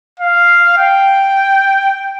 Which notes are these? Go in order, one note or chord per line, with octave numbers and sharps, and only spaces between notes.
F5
G5